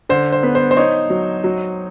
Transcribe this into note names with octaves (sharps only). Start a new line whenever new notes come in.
D3 C5
C5
B3
C5
C5
D#4 C#5
F#3
F#3